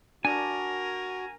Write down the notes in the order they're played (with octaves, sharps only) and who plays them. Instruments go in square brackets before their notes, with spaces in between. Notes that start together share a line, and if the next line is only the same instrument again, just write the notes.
[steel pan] D4 [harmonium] F#4 [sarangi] A#4 [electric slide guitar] G#5